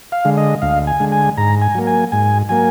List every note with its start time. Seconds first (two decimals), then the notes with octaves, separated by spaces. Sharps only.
0.12 F5
0.25 D3 G#3
0.37 D#5
0.62 D2 F5
0.87 G#5
1.00 D3 G#3
1.12 G#5
1.37 G#2 A#5
1.62 G#5
1.75 F#3 A#3
1.87 G#5
2.12 G#2 G#5
2.49 F#3 A#3 G#5